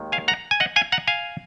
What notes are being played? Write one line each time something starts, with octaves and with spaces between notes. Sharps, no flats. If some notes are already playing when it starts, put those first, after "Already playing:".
Already playing: D#2 D#3 G#3
F5 G#5
F#5 A#5
G#5
D#5 F#5
F5 G#5
F#5 A#5
F5 G#5